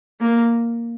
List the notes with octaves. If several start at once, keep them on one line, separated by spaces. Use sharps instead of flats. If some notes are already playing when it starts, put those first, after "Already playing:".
A#3